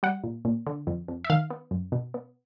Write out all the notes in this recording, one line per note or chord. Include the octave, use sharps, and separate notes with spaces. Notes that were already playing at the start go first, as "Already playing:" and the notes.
G3 F#5
A#2
A#2
D3
F2
F2
E5
D#3 F5
B3
F#2
B2
B3